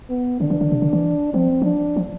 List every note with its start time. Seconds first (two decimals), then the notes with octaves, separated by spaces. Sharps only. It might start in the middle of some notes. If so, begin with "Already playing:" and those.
0.09 B3
0.40 D3 D4
0.50 E3
0.61 D3
0.72 C3
0.82 D3
0.93 E3
1.34 F3 C4
1.62 F3 D4
1.96 F3